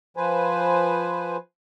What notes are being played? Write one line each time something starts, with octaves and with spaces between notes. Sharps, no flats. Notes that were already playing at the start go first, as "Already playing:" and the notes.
F3 B4 C5 G#5